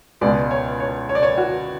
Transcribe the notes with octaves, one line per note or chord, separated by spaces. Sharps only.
C#2 B2 G#3 D5
C#5
C#5
C#5
D5
C#5
F#4